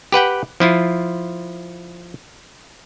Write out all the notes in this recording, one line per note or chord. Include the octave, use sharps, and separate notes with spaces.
G4 B4 F#5 G5
F3 E4 F4